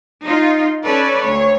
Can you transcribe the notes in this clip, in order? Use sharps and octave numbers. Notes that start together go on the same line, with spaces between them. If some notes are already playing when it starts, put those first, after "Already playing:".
D#4 F4
C#4 A4 B4 C#5 D5
D2 C#5